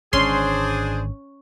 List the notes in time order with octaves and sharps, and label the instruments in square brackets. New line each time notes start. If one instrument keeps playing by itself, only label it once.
[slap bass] G#1 G#2 D3 [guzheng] C#4 [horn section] D4 G#4 C5 [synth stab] C6